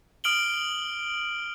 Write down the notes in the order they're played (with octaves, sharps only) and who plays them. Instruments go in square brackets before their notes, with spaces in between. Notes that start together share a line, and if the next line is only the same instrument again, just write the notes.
[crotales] D#6 F6 D7 F#7 G7